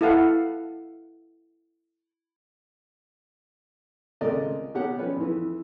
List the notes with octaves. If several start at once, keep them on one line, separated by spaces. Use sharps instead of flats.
E4 A4 F5 F#5
C#2 C3 A3 A#4 D5 D#5
B2 D#3 G4 C#5 F#5
F3 B3 C#4 B4
F2 E3